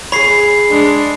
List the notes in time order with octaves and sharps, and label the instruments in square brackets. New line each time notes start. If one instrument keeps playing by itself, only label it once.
[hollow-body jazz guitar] G#4 C#5 [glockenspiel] B5 C7
[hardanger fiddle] G#3 D4